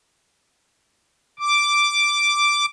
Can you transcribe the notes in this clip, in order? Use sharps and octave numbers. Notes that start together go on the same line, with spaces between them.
D6